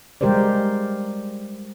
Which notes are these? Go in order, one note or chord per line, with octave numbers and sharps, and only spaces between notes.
G3 G#3 G4 A#4 C5 D5